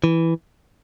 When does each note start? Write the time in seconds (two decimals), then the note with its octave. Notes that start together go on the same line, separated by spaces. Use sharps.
0.04 E3